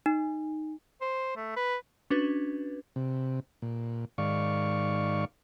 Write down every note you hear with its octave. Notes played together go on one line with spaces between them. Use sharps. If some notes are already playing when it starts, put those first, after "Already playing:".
D#4
C5
A3
B4
C#4 D4 F#4 B4
C3
A#2
G#2 D#3 D5 F5 C#6